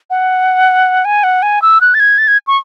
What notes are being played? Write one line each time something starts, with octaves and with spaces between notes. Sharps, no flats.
F#5
G#5
F#5
G#5
E6
F#6
A6
G#6
A6
G#6
C#6